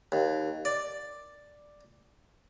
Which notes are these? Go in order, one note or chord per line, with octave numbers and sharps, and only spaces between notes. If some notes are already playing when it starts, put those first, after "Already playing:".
D#2
D5